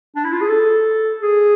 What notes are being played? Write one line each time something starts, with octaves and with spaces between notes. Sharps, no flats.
D4
E4
F4
G#4
A4
G#4